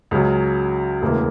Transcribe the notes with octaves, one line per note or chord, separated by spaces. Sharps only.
C#2 C#3 F#3
E1 D2 C#3 E3 A#3